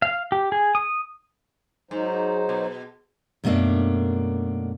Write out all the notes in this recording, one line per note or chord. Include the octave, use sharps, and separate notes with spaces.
F5
G4
G#4
D#6
G#2 F#3 D#4 C5
B2
F#2 B2 A3 A#3 D4